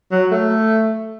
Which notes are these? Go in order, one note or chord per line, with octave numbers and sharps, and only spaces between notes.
F#3
A3